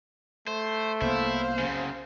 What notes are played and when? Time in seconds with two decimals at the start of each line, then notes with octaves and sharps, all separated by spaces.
0.48 A3 C5
1.01 C2 A#3 B3 E4 C5 F5
1.59 F#2 C#3